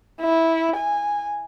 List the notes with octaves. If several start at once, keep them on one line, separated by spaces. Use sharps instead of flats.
E4
G#5